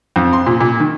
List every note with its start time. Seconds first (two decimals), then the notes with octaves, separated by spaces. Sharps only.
0.16 F2
0.33 C6
0.46 A#2
0.60 A#2
0.80 D#3